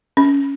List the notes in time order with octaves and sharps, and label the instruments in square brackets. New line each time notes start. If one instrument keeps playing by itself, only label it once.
[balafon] C#4